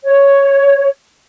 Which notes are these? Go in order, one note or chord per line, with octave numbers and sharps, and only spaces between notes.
C#5